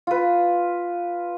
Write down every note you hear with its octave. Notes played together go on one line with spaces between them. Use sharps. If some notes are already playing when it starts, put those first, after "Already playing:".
F4 B4